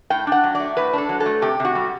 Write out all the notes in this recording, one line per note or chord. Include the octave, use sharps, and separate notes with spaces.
A2 G5
D4 F#5
F#3
D5
A3
A2 B4
D4 A4
F#3
A4
A3
C3 G4
C3
F#4
G3